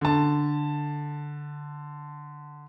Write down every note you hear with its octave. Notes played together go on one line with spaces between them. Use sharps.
D3 A5